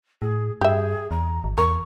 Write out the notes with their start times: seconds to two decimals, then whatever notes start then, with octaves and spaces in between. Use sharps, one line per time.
0.22 A2 G#4
0.61 G2 G4 G#4 E5
1.11 E2 A#5
1.44 G#1
1.58 E2 A#4 C#6